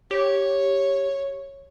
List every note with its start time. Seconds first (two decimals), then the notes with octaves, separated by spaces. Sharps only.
0.11 G4 C#5